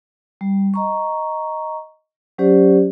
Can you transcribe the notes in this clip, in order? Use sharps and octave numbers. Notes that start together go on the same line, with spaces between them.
G3
D#5 A#5 C#6
F#3 C#4 G4 C5 D5